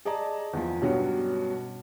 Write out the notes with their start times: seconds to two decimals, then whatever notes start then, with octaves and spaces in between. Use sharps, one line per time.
0.05 G#4 D5 D#5 A5 A#5
0.53 E2 F3
0.81 G2 B2 F#3 G3 C#4 F#4